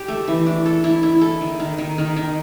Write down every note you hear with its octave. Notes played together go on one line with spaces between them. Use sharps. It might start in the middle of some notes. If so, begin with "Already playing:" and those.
Already playing: G4
A3
E3
D4
A4
E4
E4
A4
D#3
D#3
D#3
D#3
D#3